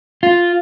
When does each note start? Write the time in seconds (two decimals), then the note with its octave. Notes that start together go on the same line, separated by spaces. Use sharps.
0.23 F4